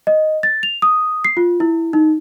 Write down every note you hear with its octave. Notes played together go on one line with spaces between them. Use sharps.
D#5
A6
F7
D#6
C7
F4
E4
D#4